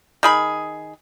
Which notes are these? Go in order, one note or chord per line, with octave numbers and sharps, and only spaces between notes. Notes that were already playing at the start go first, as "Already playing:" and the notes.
D#3 G#4 B5